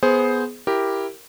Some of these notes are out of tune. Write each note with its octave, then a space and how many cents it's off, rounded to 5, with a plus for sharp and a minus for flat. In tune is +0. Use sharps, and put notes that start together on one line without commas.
B3 +0 G#4 +15 C5 +0
E4 +0 G4 +0 A#4 +0